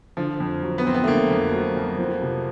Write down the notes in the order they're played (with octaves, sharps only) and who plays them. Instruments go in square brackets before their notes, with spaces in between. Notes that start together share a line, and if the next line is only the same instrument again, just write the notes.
[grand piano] D3 [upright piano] F3
[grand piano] F2
F#3
[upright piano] B3
[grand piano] F2 [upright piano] C4
[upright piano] B3
A3
[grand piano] D3 [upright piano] A#3
[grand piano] F2
F#3
F2
F3
C3